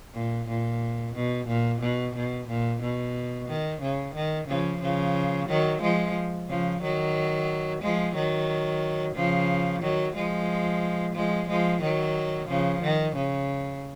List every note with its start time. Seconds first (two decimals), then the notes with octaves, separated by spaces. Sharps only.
0.14 A#2
0.48 A#2
1.15 B2
1.47 A#2
1.81 B2
2.15 B2
2.48 A#2
2.82 B2
3.48 D#3
3.81 C#3
4.14 D#3
4.48 C#3 F3
4.81 C#3 F3
5.48 D#3 F#3
5.82 F3 G#3
6.48 C#3 F3
6.82 D#3 F#3
7.81 F3 G#3
8.15 D#3 F#3
9.15 C#3 F3
9.82 D#3 F#3
10.15 F3 G#3
11.15 F3 G#3
11.48 F3 G#3
11.82 D#3 F#3
12.48 C#3 F3
12.82 D#3
13.15 C#3